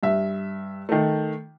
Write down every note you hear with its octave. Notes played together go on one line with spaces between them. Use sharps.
G2 E5
D#3 A3